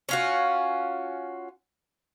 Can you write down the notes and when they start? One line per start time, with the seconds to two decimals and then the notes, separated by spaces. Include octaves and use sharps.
0.09 C#4 F4 F#4